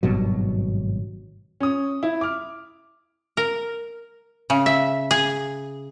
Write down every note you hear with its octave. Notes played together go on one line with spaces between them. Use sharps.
G#1 G2 B2 F#3
C#4 D#6
E4
D6 F6
A#4
C#3
E5
G#4